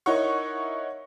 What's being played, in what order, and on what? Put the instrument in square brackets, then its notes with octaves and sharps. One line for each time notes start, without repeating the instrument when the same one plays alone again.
[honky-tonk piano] D#4 E4 A#4 C#5 F#5 C#6